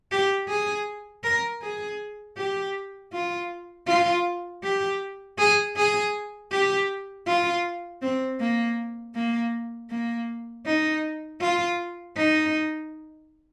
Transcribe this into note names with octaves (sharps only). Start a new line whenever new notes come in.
G4
G#4
A#4
G#4
G4
F4
F4
G4
G#4
G#4
G4
F4
C4
A#3
A#3
A#3
D#4
F4
D#4